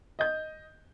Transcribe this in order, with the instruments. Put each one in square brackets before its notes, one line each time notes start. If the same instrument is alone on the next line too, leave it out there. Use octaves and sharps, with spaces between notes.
[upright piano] D#5 G6